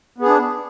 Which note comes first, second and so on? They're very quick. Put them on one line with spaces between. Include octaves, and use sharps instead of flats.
B3 G#4 D4